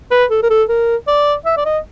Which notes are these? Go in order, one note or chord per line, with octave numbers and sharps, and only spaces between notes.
B4
A4
A#4
A4
A#4
D5
E5
D5
D#5